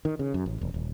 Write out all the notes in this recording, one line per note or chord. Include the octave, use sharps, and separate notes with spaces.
D#3
C#3
F#2
A1
E1
D#1